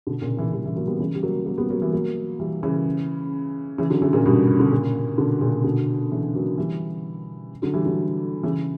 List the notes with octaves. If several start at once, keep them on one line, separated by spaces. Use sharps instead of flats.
B2 D3
A#2 C#3
C#3 E3
E3 G3
E3 G3
F#3 A#3
G3 B3
C#3 E3
G3
F#3 A#3
F#3 A#3
G3 B3
F#3 A#3
E3 G3
F#3 A#3
E3 G3
C#3 E3
C#3 E3
D3 F#3
C#3 E3
A#2 C#3
G2 B2
D3
A#2 C#3
B2 D3
A#2 C#3
B2 D3
C#3 E3
F#3 A#3
E3 G3
D3 F#3
E3 G3
D3 F#3
C#3 E3